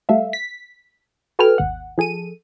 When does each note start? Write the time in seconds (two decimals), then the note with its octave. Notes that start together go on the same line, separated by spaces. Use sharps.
0.09 G3 A3 A4 E5 F5
0.33 B6
1.39 F#4 A4 B4 G5 G#5 F6
1.58 G#1 D#2 F#5
1.98 F3 G#4 A4 D#7